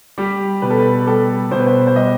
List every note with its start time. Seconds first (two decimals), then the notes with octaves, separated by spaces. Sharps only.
0.18 G3 G4
0.62 B2 B4
0.70 A4
0.79 B4
1.07 G3 A4
1.51 B2 C5
1.59 B4
1.67 C5
1.87 C5
1.96 G3 D#5